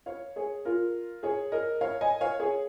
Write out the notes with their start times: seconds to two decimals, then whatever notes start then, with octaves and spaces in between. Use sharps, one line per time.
0.06 C#5 F5
0.36 G#4 C#5
0.65 F4 A#4
1.23 G#4 C#5
1.52 A#4 D#5
1.81 C#5 F5
2.01 D#5 G#5
2.21 C#5 F5
2.40 G#4 C#5